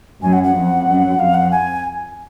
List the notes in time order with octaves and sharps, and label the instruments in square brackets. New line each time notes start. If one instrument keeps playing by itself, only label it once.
[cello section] F#2 [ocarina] G#5
[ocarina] F#5
F#5
[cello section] F2
F#2
[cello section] F2 [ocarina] F5
[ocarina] F#5
G#5